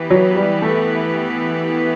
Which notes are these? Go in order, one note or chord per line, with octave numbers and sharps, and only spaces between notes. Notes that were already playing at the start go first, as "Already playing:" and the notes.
Already playing: E3 B3 E4 G4 B4
F#3
G3
A3